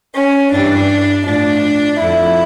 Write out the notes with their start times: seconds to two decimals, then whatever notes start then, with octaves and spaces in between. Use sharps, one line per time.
0.15 C#4
0.52 G2 E3 G3 D4
1.25 A2 F3 D4
2.00 F2 D3 F3 E4